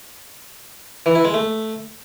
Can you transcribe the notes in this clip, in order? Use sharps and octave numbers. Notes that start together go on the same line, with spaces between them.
E3
E4
G#3
A3